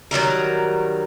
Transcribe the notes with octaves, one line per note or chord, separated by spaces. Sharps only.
D#3 F#3 G3 A#4